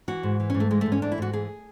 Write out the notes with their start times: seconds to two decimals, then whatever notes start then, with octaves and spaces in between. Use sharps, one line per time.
0.08 E3 F#4
0.23 G#2
0.40 E3
0.50 C#4
0.54 G#2
0.60 A3
0.70 E3 G#3
0.81 A3
0.86 G#2
0.92 C#4
1.02 E3 D4
1.12 E4
1.18 G#2 F#4
1.33 E3 G#4